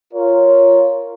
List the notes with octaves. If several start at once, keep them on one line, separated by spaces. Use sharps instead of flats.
F4 A#4 C#5